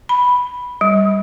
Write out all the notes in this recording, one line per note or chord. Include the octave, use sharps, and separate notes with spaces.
B5
G3